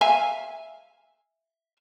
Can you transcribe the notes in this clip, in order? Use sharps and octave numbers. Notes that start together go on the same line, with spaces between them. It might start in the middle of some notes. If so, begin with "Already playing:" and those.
E5 F5 G#5